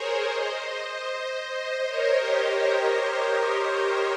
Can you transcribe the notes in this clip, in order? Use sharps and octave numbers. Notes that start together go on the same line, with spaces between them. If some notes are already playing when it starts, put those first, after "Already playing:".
Already playing: G#4 A#4 C5 C#5
C5 D#5
C5 D#5
A#4 C#5
G4 A#4